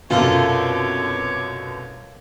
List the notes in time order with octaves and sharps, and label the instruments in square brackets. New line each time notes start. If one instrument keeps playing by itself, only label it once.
[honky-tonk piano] C2 F#2 B2 [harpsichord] F4 A4 A#4 [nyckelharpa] C#5 D6